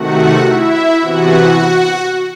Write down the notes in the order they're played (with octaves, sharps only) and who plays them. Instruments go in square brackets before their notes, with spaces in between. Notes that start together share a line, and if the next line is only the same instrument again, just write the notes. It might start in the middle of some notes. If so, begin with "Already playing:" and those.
Already playing: [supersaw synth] C3 D#3 A3 F#4 F#5
E4 E5
C3 E3 B3 F#4 F#5